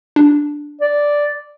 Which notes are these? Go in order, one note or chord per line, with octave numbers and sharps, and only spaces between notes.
D4
D5